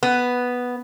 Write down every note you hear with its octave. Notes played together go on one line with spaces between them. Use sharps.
B3